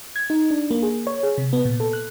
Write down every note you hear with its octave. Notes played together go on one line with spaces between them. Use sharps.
G#6
D#4
D4
A#3
G#4
C#5
G#4
C3
B3
A#2
A4
F#6